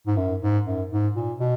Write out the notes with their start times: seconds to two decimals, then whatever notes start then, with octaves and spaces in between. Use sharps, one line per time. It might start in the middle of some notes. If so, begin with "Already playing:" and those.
0.07 G#2
0.17 F#2
0.42 G#2
0.65 F#2
0.91 G#2
1.16 A#2
1.40 B2